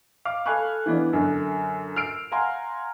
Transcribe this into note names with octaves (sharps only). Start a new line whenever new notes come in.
F5 D6 F6
A4 F5 G#5 B5 C#6 F#6
E3 B3 D4
F#2 D3
E6 F6 C7 D7
F5 F#5 G#5 A#5 C6